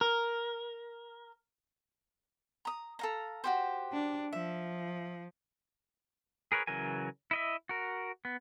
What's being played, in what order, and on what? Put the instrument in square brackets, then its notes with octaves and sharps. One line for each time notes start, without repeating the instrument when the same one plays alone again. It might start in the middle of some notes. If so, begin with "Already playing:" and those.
[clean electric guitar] A#4
[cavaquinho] A#5 D#6
A4 F5 A#5
F#4 G4 C5
[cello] D4
[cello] F3 [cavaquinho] E5
[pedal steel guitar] G#4 A#4 B4 C#5
C#3 E3 F#3 A#4 G#5
E4 D#5 E5
F#4 A#4
B3